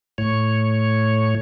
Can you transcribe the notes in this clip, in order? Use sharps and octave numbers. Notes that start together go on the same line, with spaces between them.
A2 C#5